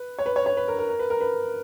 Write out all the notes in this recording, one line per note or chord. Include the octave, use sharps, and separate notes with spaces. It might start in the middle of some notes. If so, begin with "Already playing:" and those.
Already playing: B4
C#5
B4
C#5
C#5
B4
A#4
A#4
A#4
B4
A#4
B4